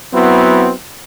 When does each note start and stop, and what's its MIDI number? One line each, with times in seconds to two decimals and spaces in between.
0.14 0.71 54
0.14 0.71 59
0.14 0.71 60
0.14 0.71 64